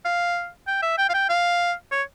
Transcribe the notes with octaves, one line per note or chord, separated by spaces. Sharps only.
F5
G5
E5
G5
F5
G5
F5
C#5